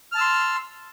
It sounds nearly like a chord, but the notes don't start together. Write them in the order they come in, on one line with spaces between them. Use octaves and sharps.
F6 A5 E6 C6